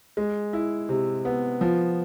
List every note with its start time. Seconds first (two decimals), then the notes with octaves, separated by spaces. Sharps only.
0.17 G#3
0.53 E4
0.89 C3
1.25 B3
1.61 F3